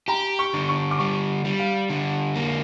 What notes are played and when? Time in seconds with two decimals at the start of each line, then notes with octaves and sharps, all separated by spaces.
0.08 G4 A#5
0.39 C#6
0.54 D3
0.69 C#6
0.91 D6
0.99 G3 C#6
1.45 G3
1.59 F5
1.90 D3
2.36 A#3